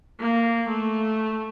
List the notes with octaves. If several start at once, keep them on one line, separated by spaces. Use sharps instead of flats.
A#3
A3